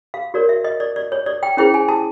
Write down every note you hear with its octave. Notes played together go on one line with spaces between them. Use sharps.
F5
F#4 A#4 C#5 D5
E5
D#5
D5
D5
C#5
D5
G5
C#4 E4 G#4 C5 G5
G#5
A5